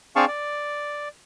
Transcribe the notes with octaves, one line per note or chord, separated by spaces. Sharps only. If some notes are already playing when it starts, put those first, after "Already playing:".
C4 D4 G#4 F5 A5 C#6
D5